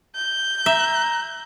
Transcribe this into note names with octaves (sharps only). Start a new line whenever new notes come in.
G6
E5 A#5